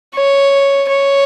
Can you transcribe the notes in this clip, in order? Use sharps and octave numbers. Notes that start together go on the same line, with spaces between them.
C#5
C#5